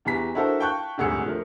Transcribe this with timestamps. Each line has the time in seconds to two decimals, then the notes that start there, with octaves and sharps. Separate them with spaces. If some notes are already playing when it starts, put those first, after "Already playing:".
0.05 E2 E3 G4 A#5 B6
0.34 D4 E4 F#4 A4 A#4 C5
0.60 F5 G5 A5 C#6 F#6 G6
0.98 D#1 G#1 D2 G#4 E6 C#7
1.26 F3 A3 A#4